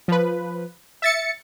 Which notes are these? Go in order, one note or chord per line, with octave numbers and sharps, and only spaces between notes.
F3 B4
E5 A6 C#7